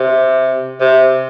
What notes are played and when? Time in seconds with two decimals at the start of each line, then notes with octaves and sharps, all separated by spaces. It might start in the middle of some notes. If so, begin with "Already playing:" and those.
Already playing: C3
0.81 C3